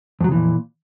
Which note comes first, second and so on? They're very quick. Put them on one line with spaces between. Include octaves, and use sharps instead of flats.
F2 F#3 C#3 E3 A#2